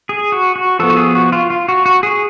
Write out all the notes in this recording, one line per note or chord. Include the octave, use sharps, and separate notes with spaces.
G#4
F#4
F#4
F3 B3 A4
F#4
G#4
F#4
F4
F4
F#4
F#4
G#4